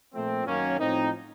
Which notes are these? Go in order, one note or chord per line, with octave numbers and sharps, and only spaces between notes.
A#2 F3 A3 C4
F#2 D#3 F#3 A#3 C#4
A2 F3 C4 D#4